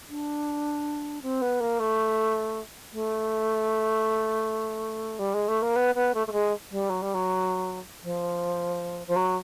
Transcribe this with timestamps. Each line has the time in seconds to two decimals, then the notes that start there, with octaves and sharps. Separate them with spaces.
0.08 D4
1.22 C4
1.41 B3
1.60 A#3
1.79 A3
2.92 A3
5.19 G3
5.34 G#3
5.48 A3
5.62 A#3
5.76 B3
5.95 B3
6.14 A3
6.27 A3
6.32 G#3
6.70 G3
6.89 F#3
7.02 G3
7.14 F#3
8.02 F3
9.07 F3
9.16 F#3